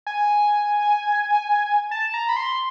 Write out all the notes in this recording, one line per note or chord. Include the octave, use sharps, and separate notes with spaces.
G#5
A5
A#5
B5
C6